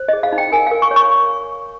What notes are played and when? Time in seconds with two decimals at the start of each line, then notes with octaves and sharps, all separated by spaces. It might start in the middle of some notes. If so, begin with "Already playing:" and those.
Already playing: C5
0.08 D#5
0.13 G#4
0.23 F5
0.32 D#4
0.38 G5
0.52 A#4 G#5
0.67 F5
0.71 A#4
0.82 C#6
0.91 C#5
0.96 C#6